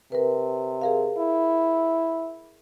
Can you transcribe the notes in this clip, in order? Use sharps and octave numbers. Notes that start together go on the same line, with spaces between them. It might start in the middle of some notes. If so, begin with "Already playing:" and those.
C3 A#4 B4
G#4 A#4 F5
E4